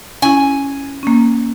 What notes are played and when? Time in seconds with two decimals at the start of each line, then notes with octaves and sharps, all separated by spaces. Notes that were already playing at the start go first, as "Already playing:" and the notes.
0.22 C#4 E4 G#5
1.03 A#3 C#4